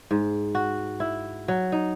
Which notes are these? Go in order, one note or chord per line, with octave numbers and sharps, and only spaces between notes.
G#2
F#4
E4
F#3
D#4